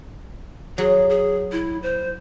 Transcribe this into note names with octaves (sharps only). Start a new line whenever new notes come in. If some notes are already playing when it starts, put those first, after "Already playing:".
F#3 G#4
G#4
E4
C5